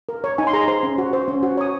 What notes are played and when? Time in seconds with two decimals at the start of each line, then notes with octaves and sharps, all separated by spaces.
0.09 A#4
0.24 C#5
0.38 D#4 G#5
0.47 C6
0.53 G#4 A#5
0.68 C5 C6
0.83 C#4
0.98 F#4
1.13 C5
1.28 C#4
1.43 F#4
1.57 C#5 D#6